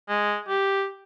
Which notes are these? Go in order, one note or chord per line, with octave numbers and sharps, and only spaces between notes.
G#3
G4